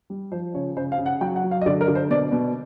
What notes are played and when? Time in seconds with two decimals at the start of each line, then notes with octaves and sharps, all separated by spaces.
0.10 G3
0.32 F3 C5
0.54 C#3 C#5
0.77 C#3 C5
0.92 F5
0.98 C#3
1.06 F#5
1.21 F#3 G5
1.36 F#5
1.44 F#3
1.51 F5
1.61 D#5
1.66 D3 D5
1.81 A#4
1.88 D3
1.95 C5
2.10 B2 D5
2.32 B2